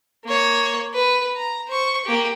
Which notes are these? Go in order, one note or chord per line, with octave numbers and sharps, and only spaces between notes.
A#3 C#5
B4
A#5
C5 C#6
A#3 G4